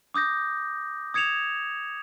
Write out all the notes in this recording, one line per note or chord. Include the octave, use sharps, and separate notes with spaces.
D6 D#6 G6 A#6
D#6 G#6 C#7 E7 F7